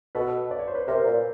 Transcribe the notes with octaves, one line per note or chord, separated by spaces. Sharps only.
B2 A4 B4
D5
C#5
C5
B4 C#5
C3 A#4 C5
A#2